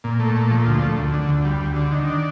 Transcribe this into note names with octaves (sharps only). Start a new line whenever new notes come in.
A#2
A3
A#2
F3
D2
A3
D2
D3
D2
G3
D2
D3
D#3
D4